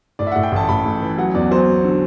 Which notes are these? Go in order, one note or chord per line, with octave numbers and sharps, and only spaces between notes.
A2 D5
E5
A2 F#5
G5
A1 A5
A1 B5
A1
E3
F#3 F#5
E2 D5
F#3 C5
E2
D3